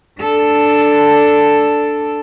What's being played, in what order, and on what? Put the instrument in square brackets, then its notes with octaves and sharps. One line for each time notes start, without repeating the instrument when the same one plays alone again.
[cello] D4 A4